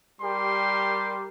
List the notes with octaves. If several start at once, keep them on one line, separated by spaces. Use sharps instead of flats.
G3 G4 A#4 C6